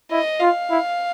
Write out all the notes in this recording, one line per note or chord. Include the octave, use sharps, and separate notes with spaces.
E4 D#5
F4 F5
E4